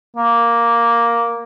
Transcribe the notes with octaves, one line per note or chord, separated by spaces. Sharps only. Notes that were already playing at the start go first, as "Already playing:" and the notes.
A#3